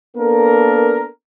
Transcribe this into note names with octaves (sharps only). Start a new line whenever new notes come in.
A#3 B3 D4 A4 A#4